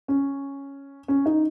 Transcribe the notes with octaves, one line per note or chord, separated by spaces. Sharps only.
C#4
C#4
D#4